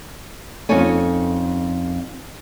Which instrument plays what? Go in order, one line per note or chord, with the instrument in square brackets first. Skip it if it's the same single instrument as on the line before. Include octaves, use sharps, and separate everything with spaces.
[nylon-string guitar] F2 C#4 D#4 A4 C#5 G#5